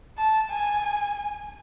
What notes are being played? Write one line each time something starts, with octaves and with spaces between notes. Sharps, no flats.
A5
G#5